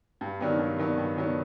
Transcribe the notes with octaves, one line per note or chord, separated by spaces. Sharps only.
G2
D#3 F#3 B3 D4
G2
D#3 F#3 B3 D4
G2
D#3 F#3 B3 D4